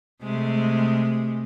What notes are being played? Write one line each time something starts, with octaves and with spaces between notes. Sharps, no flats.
C3 G#3 A3